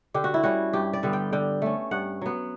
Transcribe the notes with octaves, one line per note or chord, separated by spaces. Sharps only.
D3 G4
F#4
E4
G3 C#4 F#4
G2 G4
D5
D3 G3 B3
G5
D3 G5
A3 C#4
G2 F#5
F#3 B3